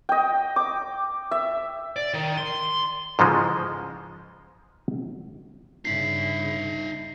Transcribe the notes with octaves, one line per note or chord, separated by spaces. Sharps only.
D#5 G5
D6
E5
D5
D#3
C6
G#2 C#3 E3 F3 G#3
G2 C#3 D#4 E5 C7